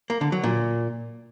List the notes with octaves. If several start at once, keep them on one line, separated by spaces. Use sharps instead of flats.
A#3
D3
F#3
A#2